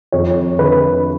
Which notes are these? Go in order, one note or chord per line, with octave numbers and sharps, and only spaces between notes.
F2 C#5
D3 B4